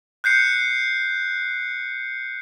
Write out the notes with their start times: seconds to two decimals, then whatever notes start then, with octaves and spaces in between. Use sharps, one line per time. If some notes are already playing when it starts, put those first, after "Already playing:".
0.24 F#6 G6 C7 C#7